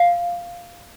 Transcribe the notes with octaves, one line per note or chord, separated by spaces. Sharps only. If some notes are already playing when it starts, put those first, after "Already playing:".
Already playing: F5